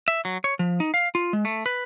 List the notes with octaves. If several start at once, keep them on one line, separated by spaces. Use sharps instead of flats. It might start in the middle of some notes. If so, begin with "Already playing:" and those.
E5
F#3
C#5
F3
D#4
F5
F4
G#3
A3
B4